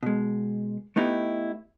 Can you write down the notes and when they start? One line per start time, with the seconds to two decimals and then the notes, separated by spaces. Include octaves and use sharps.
0.03 B2 G#3
0.96 A3 B3 D#4 E4 G4